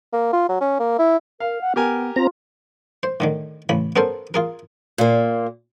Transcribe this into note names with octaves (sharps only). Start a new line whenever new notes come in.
A#3
F4
F#3
C#4
A#3
E4
A#4 F5
F#5
B3 G4 A#4 G#5
C4 F4 A#5
C5
A2 D3 D#3
A1 C#3 B5
B3 C#4 A4 A#4 C5
F4 G#4 A#4
A#2 A#3